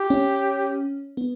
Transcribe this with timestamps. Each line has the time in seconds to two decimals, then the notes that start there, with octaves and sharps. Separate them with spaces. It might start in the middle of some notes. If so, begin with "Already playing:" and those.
Already playing: G4
0.10 C#4
1.17 B3